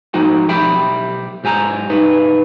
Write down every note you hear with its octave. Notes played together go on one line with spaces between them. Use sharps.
G#2 F3 D#4 F#4 G5
B1 G4 E5 G5 B5
G#2 G4 G#5 A#5
G2 D#4 B4